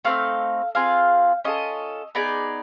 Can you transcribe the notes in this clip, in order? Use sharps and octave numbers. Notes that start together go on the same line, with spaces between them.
A3 C4 D#4 F5
C4 F4 G#4 F5
C#4 F4 A4 D#5
B3 D#4 G#4 D5